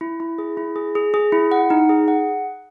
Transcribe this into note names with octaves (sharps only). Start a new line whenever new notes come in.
E4
E4
G#4
E4
G#4
G#4
G#4
E4
F#5
D#4
G#4
F#5